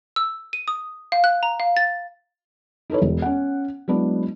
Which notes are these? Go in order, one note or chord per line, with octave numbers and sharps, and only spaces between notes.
E6
D#7
D#6
F5
F#6
A#5
F5
A6
D#4 E4 A4 B4 C#5
E1
C#4 F#5
F#3 G#3 B3 D4 E4